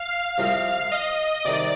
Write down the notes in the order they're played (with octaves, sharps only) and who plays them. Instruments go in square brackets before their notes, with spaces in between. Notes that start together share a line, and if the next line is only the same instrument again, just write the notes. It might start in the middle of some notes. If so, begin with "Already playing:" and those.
Already playing: [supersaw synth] F5
[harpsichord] C2 C3 F3
[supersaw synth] D#5
[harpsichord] C3 D#3 G3 [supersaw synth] D5